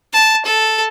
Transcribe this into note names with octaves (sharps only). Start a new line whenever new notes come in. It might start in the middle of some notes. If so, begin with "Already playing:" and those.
A5
A4